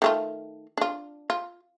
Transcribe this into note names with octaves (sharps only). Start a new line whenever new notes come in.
D#3 A3 F4
D4 F4
F4